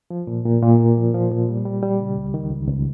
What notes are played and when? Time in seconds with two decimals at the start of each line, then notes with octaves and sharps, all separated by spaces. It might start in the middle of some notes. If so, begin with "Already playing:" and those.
0.10 F3
0.27 A#2
0.46 A#2
0.62 A#2
0.80 A#3
0.97 F3
1.14 F3
1.31 A#2
1.49 G3
1.65 G3
1.83 G3
2.01 C#3
2.17 C#2
2.34 D#3
2.51 C#2
2.68 C#2